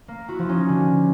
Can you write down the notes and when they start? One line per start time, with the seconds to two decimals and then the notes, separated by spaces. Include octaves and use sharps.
0.08 A#3
0.28 E4 F#4
0.39 F3
0.49 C#4 D#4
0.69 D3